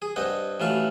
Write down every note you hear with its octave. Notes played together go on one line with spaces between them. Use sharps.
G#4
G2 C4 D#5 F#5
A1 E3 F#3 F5 A5